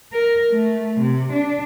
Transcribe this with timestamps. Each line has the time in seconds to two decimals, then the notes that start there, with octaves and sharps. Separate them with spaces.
0.13 A#4
0.52 A3
1.01 C3
1.33 D4